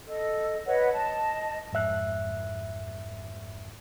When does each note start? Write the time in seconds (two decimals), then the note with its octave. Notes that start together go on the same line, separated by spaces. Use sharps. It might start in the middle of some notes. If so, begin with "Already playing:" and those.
0.07 A4 D#5
0.66 B4 C#5 D#5 F#5
0.94 D#5 A5
1.73 F2 G#2 E5 F#6